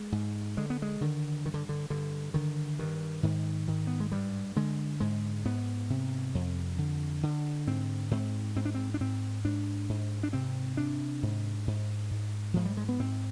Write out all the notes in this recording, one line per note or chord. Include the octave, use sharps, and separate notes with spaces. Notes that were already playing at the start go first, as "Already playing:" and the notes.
Already playing: G#3
G#2
D3 G#3
B3
G#3
D3 D#3
G2 D#3
D3
D3
G2 D3
D3 D#3
G2 D#3
G#2 D#3
G#2 D#3
B3
G#3
G2 G3
D3 G#3
G#2 G#3
G#2 B3
C3
F2
D3
D3
G#2 C4
G#2 C4
G#2 C4
D4
C4
D4
G#2 C4
G#2 D4
G#2
D4
C3 C4
C3 D4
G#2
G#2
G#2
G#2 F3
G3
G#3
B3
G#2 C4